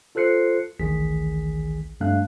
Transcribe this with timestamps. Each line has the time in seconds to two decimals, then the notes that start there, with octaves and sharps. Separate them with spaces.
0.15 F4 A4 C5 F#6 C7 C#7
0.80 A1 D2 D#3 G#4 B6
2.01 G2 A3 D4 F5 F#6